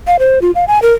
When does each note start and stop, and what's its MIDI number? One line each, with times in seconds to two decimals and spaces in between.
0.07 0.17 77
0.19 0.39 72
0.42 0.51 65
0.55 0.65 77
0.68 0.81 80
0.82 0.92 70